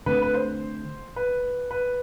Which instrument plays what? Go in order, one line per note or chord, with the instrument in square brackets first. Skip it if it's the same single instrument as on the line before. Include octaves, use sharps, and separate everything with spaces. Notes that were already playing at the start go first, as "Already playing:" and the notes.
[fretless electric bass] D3 A3 C4 [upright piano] B4
[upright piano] B4
C5
B4
B4